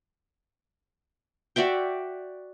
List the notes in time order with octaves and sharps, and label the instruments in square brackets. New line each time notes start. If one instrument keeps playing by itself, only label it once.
[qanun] F#4 D5 E5 G5